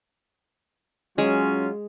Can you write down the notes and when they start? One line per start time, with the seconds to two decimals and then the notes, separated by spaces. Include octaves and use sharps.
1.18 F#3 G#3 C#4 F4